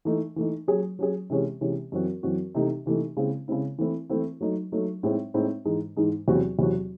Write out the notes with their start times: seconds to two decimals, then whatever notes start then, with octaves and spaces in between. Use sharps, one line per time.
0.05 E3 A3 D#4
0.36 E3 A3 D#4
0.68 F#3 C#4 G#4
0.99 F#3 C#4 G#4
1.30 C3 E3 G#3 C#4
1.61 C3 E3 G#3 C#4
1.92 F#2 E3 C4 F#4
2.23 F#2 E3 C4 F#4
2.55 C3 E3 A3 D#4
2.86 C3 E3 A3 D#4
3.17 C#3 G#3 C4 E4
3.48 C#3 G#3 C4 E4
3.78 E3 A3 C4 E4
4.10 E3 A3 C4 E4
4.41 F#3 A3 D#4
4.72 F#3 A3 D#4
5.03 A2 G#3 C4 D#4
5.34 A2 G#3 C4 D#4
5.65 G#2 E3 G#3 D#4
5.97 G#2 E3 G#3 D#4
6.28 E2 C3 F#3 C4 F#4
6.59 E2 C3 F#3 C4 F#4